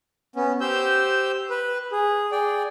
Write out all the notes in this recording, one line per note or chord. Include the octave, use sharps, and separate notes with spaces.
B3 C#4
G4 C5 E6 G6
B4
G#4
G#4 D5 G5